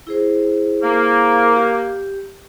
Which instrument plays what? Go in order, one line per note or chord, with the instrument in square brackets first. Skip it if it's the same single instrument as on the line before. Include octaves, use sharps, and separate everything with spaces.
[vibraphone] E4 G#4 C5
[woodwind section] A#3
[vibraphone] G4